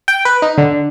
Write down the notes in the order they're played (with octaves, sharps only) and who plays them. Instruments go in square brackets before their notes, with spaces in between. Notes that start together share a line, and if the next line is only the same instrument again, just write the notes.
[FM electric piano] G5
B4
D#4
D3